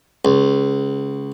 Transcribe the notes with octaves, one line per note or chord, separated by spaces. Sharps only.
C#2